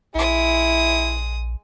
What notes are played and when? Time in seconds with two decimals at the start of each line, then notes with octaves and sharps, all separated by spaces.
0.15 A#1 G#3 E4 D#6